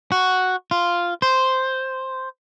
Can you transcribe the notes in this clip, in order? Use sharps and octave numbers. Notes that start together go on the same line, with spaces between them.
F#4
F4
C5